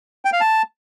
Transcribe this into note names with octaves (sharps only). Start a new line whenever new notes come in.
G5
F5
A5